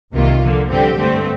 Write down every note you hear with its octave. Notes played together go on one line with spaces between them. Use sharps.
C2 C3 D#3 A#3 F4
D3 F3 A#3
G2 D3 F3 C4 G4
G2 D3 A3 C4